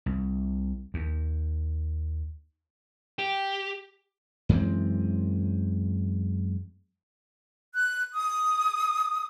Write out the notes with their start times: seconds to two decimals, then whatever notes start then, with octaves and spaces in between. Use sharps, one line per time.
0.06 C2
0.94 D#2
3.19 G4
4.49 F#2 E3 G#3 C4
7.74 F#6
8.14 D#6